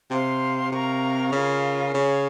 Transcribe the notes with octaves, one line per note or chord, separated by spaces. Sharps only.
C3 C5 F5 C6
C3 A#4 F5 A#5 C#6
C#3 C#4 F4 A#4 C#5
C#3 G#4 C#5 F5